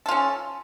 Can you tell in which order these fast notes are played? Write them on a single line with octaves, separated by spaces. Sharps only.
A4 F4 C#4